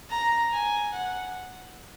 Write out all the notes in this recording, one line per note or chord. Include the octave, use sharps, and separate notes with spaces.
A#5
G#5
F#5